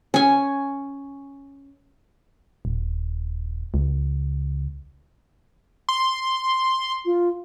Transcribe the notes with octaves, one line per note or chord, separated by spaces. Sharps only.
C#4 G#5
D#1
C#2
C6
F4